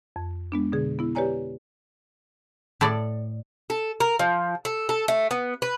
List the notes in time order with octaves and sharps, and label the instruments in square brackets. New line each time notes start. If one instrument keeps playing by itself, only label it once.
[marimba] F2
G#3 B3 D4
B2 D3 G#4
B3 E4
G4 B4 C#5 D5 G#5 A#5
[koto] A2 A4 D5
[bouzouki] A4
A#4
F3
A4
A4
A3
B3
B4